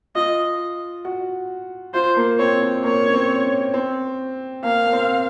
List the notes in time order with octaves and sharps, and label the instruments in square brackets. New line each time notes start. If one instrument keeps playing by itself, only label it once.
[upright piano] F4 [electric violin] D#5
[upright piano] F#4
[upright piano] F4 [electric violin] C5
[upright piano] A#3
[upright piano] C4 [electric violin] C#5
[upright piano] C4
[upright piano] A#3 [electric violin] C#5
[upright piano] C#4
C4
C#4
C4
[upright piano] A#3 [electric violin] F5
[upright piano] A#3
C4